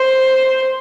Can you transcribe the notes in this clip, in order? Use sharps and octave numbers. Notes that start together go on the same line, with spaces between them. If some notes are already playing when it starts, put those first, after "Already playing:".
Already playing: C5